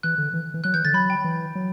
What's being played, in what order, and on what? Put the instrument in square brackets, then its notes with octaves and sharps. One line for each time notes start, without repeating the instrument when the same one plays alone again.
[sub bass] E3 [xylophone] F#6
[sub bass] D3
E3
E3
[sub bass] F#3 [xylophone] F#6
[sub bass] E3 [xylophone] G6
[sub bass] D3 [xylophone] A6
[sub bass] F#3 [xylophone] B5
[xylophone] G5
[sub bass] E3
F#3